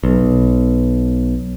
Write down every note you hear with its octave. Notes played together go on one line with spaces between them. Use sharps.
B1